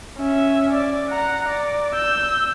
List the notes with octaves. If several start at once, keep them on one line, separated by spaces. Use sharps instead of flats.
C#4 E5
D5
F#5 A#5
D5
E6 G6